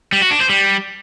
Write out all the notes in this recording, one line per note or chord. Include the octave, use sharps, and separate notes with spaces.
G3
F#4
D4
C5
G3